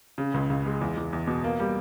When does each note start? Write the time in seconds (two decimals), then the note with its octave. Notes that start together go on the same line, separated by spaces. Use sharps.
0.18 C#3
0.34 C#2
0.50 C#2
0.65 G#3
0.81 E2
0.97 E2
1.13 E2
1.27 B2
1.44 A#3
1.60 G3